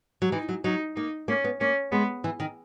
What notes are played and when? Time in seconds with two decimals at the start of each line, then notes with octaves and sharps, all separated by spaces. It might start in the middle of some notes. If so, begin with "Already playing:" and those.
0.22 F#3
0.32 E3 D#4
0.49 F#3
0.64 F#3 D#4
0.96 A#3 D#4
1.28 A#3 C#4
1.44 B3
1.60 A#3 C#4
1.92 G#3 B3
2.24 E3
2.40 D#3